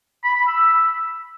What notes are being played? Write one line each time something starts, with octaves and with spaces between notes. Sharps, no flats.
B5
B5
E6